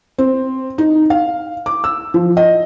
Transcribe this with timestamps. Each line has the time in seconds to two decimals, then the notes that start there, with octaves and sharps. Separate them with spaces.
0.18 C4
0.78 D#4
1.10 F5
1.66 D6
1.84 E6
2.14 F3
2.37 D#5